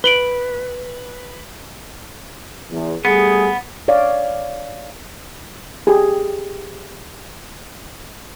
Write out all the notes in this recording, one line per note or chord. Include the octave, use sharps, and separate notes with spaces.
B4 D7 F#7 G7
E2
G3 A3 B3 G#4
C#5 D5 F5
G4 G#4